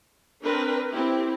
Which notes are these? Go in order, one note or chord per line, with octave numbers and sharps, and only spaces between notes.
C4 D4 A#4 B4
C4 E4 G4